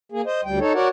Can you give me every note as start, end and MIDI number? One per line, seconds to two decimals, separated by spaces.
0.12 0.22 58
0.12 0.22 68
0.26 0.41 72
0.26 0.41 75
0.45 0.59 38
0.45 0.59 55
0.45 0.59 79
0.60 0.73 63
0.60 0.73 69
0.60 0.73 73
0.74 0.88 66
0.74 0.88 70
0.74 0.88 73
0.74 0.88 74
0.74 0.88 78